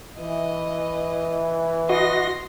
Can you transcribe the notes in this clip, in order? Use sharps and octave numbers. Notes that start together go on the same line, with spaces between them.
E3 D#5
F#4 D#5 C6 A#6